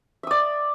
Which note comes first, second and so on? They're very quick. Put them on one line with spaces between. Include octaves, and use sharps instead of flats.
E5 D#6 D5